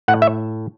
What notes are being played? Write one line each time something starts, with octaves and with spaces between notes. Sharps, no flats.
A2 F#5
E5